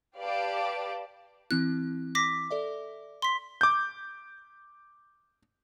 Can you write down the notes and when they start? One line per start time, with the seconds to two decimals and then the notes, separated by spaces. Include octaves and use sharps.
0.19 G4 B4 D5 F5 A5 D6
1.51 E3 C4 E4 F#6
2.15 D6 A#6 B6
2.51 A4 D5 E5
3.22 C6 B6
3.61 D6 G6